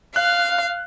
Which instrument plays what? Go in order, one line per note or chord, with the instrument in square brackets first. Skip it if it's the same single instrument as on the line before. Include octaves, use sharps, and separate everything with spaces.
[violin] F5 [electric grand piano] F#6